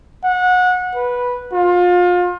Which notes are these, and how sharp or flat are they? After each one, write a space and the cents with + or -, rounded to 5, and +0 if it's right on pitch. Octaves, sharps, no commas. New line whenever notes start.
F#5 -25
B4 -10
F4 +30